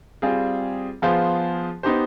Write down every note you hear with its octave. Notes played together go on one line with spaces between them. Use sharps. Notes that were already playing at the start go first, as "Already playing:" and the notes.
G3 C4 F4 G#4
F3 B3 F4 G#4 C5
B3 D#4 G4 C5